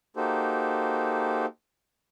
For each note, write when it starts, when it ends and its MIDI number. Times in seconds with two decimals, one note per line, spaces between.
0.16 1.46 58
0.16 1.46 63
0.16 1.46 66
0.16 1.46 67
0.16 1.46 69
0.16 1.46 72